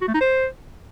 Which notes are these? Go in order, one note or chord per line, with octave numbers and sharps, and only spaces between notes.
F#4
A3
D#4
C5